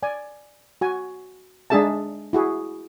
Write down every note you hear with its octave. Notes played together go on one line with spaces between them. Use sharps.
D5 G#5
F#4 G#5
G#3 D4 D#4 G#4 E5 A5
E4 F#4 G#4